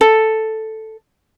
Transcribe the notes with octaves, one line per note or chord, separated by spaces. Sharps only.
A4